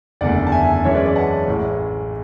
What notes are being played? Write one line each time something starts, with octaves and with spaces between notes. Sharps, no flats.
F#1 E2 D3 A3 D5 F#5
A5
E5 G#5
F#2 E3 G#3 C#4 C#5 E5
B4 D5
B4 D5
F#5 A5
A1 A2 G#3